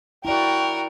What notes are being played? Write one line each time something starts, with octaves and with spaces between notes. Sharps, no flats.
E4 F#4 A#4 D5 G5